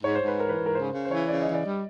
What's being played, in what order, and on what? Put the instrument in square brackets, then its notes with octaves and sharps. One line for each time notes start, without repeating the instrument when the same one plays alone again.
[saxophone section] G#2 [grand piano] C#5
[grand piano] C5
[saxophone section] G#2
[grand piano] B4
[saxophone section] E3 [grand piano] A#4
[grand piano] B4
[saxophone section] G#2
[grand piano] A#4
[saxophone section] C#3 [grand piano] C5
[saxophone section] C#3
[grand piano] C5
[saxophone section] E3 [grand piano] C#5
[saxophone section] C#3 [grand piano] D5
[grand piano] D#5
[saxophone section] E3
[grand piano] D5
[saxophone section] G3